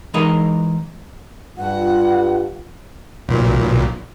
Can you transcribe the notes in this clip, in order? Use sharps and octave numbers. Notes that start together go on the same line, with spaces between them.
E3 G#3 D#4 A#4 D#5
G2 F4 F#5
B1 A#2